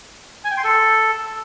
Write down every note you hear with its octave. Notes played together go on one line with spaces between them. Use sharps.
G#5
G5
C6
A4